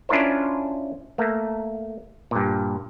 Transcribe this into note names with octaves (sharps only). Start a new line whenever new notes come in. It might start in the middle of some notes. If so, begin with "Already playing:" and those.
C#4 D4 E4 F4 A#4 C5
A3 A#3
G2 A#2